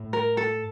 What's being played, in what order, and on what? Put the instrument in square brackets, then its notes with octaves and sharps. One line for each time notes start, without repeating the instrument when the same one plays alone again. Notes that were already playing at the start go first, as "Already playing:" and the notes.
Already playing: [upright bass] A2
[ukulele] A#4
A4